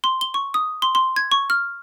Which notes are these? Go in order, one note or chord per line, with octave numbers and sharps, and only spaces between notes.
C6
G7
C#6
D#6
C6
C6
G#6
C#6
F6